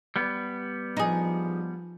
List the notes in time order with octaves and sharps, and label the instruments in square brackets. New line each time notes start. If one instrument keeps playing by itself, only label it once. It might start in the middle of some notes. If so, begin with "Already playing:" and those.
[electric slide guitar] G3 B3
[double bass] F3 [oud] D#4 G#4